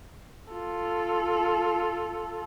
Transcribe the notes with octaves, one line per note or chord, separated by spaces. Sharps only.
F4 A4